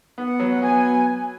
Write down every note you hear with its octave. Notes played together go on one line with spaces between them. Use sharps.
B3 F#5
F#3
B3 G#5